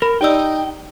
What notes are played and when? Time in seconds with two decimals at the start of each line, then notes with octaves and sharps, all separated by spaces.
0.02 A#4 B5
0.21 D#4 G4 D5 G5 E6